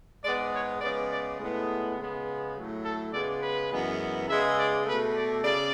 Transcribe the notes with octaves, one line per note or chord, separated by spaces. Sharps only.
G#2 G#3 B3 D5
C#5
C#3 G#3 B3 D5
D5
A2 G#3 B3
C#3 G#3 B3
A2 F#3 A3
A4
C#3 G#3 B3 D5
B4
F#2 E3 G#3 B3
C#3 G#3 B3 E5
D5
B2 A3 B4
D5
C#3 D5